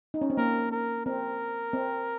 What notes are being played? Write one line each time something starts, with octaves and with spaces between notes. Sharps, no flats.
D#4
C#4
C4
A#3 A#4
A#4
C4 A#4
C4